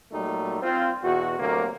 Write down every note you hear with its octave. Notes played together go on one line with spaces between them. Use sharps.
A#2 F#3 G3 A3 D#4
C4 F4
E2 B2 F#4
D2 C3 F#3 A#3